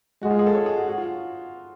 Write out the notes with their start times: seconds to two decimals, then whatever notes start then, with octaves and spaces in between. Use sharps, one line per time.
0.22 G#3 F#4
0.30 F4
0.39 G#4
0.47 A4
0.55 C#5
0.66 G#4
0.77 F#4
0.88 F#4
0.98 F4